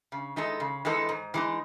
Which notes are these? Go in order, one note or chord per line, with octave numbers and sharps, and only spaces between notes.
C#3
E3 G#3 D#4 A4
C#3
E3 G#3 D#4 A4
G#2
E3 G#3 D#4